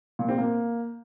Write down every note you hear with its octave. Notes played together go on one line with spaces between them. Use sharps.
A#2
C4
A#3